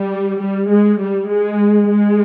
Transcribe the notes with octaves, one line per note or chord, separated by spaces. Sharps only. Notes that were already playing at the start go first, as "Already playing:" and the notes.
Already playing: G3
G3
G#3
G3
G#3
G#3